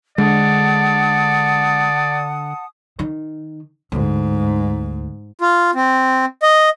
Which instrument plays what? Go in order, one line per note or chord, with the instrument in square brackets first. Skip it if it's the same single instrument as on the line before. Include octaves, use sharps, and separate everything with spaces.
[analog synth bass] D3 [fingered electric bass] G#3 [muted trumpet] D5 [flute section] F#5 A5 D#6
[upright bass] D#3
[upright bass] D2 [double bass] G#2
[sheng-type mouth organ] F4
C4
D#5